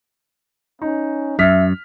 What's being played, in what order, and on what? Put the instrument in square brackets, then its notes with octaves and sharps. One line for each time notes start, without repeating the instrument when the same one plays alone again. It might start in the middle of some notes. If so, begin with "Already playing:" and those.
[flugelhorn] C#4 [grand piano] D#4
[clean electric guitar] F#2 [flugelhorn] E5 [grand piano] F6 B6